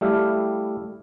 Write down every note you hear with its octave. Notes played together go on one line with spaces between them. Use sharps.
G3 A3 E4 G4 F5